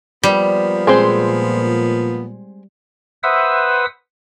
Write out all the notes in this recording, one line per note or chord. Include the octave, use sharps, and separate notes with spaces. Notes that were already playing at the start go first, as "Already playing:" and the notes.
F3 G3 A#3 B3
A#2 G#3 C4 C5
B4 C5 E5 F#5 D#6 E6